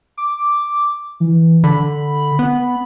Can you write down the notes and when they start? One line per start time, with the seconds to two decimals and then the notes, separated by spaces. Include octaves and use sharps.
0.17 D6
1.20 E3
1.64 D3 B5
2.39 B3